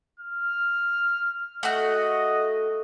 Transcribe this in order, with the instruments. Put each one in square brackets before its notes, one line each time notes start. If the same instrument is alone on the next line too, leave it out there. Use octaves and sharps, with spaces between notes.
[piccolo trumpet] F6
[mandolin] A3 F#4 [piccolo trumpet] D#5